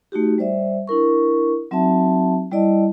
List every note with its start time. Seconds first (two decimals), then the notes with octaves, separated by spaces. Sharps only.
0.12 A3 D#4 F#4 G4
0.38 G3 C5 D5 E5
0.88 D4 E4 A#4 C#6
1.71 F#3 C4 D#4 F#4 E5 A5
2.51 G3 E4 D5 D#5 A5